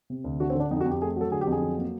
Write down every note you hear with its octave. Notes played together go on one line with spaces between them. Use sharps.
C3
D2
D3 F#4
C4
D3 D4
F2 D#4
F#4
F2 G4
A3 G#4
F#3 A4
D3 G#4
G4
F2
G#4
F#3
A#3